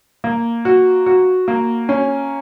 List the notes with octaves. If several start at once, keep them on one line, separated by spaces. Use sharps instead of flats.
A#3
F#4
F#4
A#3
C#4